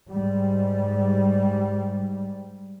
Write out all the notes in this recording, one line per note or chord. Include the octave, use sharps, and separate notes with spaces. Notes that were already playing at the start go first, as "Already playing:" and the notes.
G#2 G3